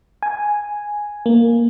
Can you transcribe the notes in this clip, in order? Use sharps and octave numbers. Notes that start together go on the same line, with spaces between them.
G#5
A#3